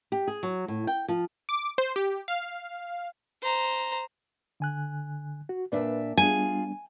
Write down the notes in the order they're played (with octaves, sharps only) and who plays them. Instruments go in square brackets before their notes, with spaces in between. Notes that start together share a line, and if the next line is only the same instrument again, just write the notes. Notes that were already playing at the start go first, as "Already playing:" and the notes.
[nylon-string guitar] G4
G#4
F#3
A2
G5
F3
[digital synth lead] D6
C5
G4
F5
[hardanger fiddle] C5 A#5
[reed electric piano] D3 G#5 F#6
F#4
[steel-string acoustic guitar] A#2 D4 E5 [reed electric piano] B4 D5
[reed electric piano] G3 B3 D4 [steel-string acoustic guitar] F4 G#4 [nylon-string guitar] G#5